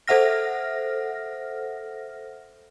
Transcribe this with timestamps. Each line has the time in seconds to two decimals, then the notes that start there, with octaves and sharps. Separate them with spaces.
0.08 A4 C5 E5 F#5 F6 A#6